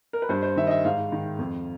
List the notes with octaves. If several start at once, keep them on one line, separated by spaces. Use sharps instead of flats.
A#4
B4
G2 C5
C5
D#3 E5
D#5
E5
G#2 F5
D#3
F2